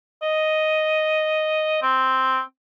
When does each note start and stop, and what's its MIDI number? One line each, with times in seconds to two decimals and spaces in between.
0.22 1.78 75
1.82 2.41 60